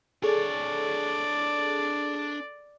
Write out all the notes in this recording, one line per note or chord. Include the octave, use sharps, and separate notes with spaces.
D4 G#4 A4 C#5 D5